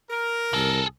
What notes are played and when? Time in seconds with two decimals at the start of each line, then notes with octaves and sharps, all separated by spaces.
0.10 A#4
0.54 C2 G#4 A4